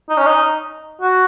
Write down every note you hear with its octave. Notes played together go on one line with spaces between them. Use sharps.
D#4
C#4
D#4
F#4